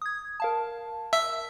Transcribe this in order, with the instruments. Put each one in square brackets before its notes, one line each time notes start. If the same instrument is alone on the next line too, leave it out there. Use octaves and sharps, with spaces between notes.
[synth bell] D#6 G#6
A#4 F5 A5
[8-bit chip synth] E5